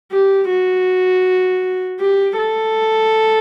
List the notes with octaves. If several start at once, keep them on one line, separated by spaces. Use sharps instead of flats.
G4
F#4
G4
A4